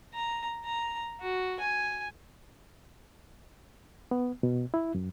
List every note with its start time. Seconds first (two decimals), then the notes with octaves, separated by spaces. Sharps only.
0.14 A#5
0.65 A#5
1.20 F#4
1.60 G#5
4.11 B3
4.43 B2
4.74 E4
4.95 F#2